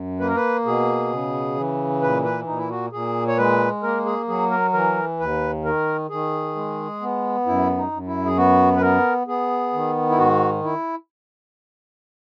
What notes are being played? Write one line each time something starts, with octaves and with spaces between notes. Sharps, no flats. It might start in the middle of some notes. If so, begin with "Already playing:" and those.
Already playing: F#2
A#3 B4
A#4
B4
B2 G#4
C#3
E3
A#2 B4
B4
A#2 D#4
E4
F#4
A#2 G#4
C#5
G#3 B4
A#3 A#4
G#4
F#3 G#4
A#4
E3 A#4
D#2 B4
D#3 A#4
D#3 G#4
G#3
B3
F#2 E4
D#4
F#2
E4
G#4
B3 F#4
B4
B3 A#4
B3 G#4
D#3
E4
G#2 F#4
E4